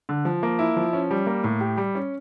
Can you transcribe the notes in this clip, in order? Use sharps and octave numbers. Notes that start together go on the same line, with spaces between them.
D3
F3
A#3
E4
F3
C#4
G3
A#3
A2
G4
G3
C#4